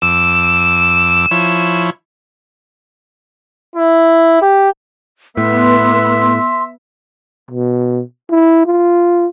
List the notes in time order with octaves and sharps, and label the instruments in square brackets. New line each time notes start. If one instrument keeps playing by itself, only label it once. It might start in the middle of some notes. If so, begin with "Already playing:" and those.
[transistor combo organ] F2 D6 E6 [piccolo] E7
[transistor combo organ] F3 E4 C#5
[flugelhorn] E4
G4
[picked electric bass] A2 [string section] B3 [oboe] E5 [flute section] C6
[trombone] B2
E4
F4